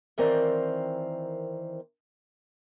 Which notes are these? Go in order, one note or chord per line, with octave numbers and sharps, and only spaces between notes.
D#3 E3 C4 A#4 C5 D5